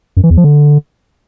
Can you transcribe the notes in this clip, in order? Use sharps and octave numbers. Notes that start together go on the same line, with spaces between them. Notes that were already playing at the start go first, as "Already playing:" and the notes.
F#2
E3
E2
F3
D3